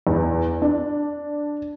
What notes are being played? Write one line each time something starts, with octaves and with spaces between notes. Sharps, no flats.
E2
D4